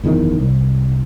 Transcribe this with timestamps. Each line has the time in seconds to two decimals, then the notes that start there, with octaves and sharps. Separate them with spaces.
0.04 F#1 E2 C3 D#3
0.40 C2